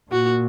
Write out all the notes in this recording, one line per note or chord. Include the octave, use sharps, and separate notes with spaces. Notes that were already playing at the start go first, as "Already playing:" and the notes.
A#2 F#4